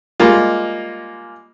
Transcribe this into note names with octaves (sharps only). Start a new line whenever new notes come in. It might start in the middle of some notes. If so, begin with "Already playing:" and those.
G3 G#3 A#3 F4